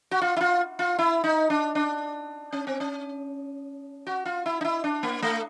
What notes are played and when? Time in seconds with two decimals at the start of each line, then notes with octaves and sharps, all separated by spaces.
0.11 F#4
0.21 F4
0.36 E4
0.41 F4
0.79 F4
0.98 E4
1.24 D#4
1.50 D4
1.75 D4
2.53 C#4
2.67 C4
2.80 C#4
4.07 F#4
4.26 F4
4.46 E4
4.61 D#4
4.65 E4
4.84 D4
5.03 A#3
5.22 A3